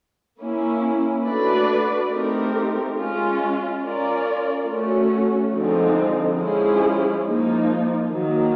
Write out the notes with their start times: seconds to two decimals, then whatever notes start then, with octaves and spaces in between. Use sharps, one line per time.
0.40 A#3 C#4 E4
1.25 A3 D4 F#4 B4 D5
2.10 A3 C4 D#4 G4 A#4
2.96 G#3 C#4 F4
3.82 C#4 F4 A#4 D5
4.67 A3 C#4 F#4
5.53 D3 F3 G#3 C4 D#4
6.39 F3 G#3 C#4 E4 G#4
7.25 F3 A#3 D#4
8.10 D#3 F#3 A#3